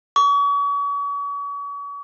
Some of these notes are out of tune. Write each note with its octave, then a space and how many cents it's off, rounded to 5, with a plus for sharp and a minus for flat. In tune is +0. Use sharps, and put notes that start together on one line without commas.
C#6 +40